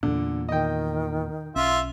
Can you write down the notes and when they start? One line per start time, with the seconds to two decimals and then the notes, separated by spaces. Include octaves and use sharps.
0.03 E2 A#2 D3
0.49 D#3 D#5 G5
1.56 B1 C#4 F4 E5